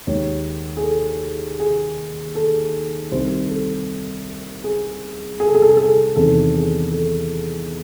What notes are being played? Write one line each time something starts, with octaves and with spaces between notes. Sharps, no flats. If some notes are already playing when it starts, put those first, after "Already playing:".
D#2 D#3 G#3 C#5
G#4
A4
G#4
A4
C2 C3 D#3 C5
A4
G#4
G#4
A4
G#4
A4
G#4
A4
G#4
E2 C3 D#3 A4
G#4
A4